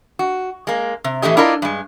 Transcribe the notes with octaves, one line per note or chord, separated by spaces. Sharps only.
F#4
G#3 A#3
C3
A2 E3 A3 C#4 G4 D#5
D4 E4 F4 A#4 D5 D#5
G2 G#3